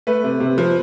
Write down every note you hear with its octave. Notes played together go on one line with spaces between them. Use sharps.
A3 B4
C3
C3
F3